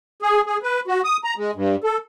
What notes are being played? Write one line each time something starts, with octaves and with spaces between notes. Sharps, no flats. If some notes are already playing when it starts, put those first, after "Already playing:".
G#4
G#4
B4
F#4
D#6
A#5
G#3
G2
A4